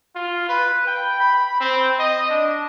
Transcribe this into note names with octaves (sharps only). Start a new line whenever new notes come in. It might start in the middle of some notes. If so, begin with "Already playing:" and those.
F4
B4
G5
B5
C4
D#5
D4